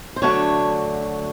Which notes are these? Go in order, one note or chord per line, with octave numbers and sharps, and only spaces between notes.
C5
D2 D3 F#3 A3 D4 C#5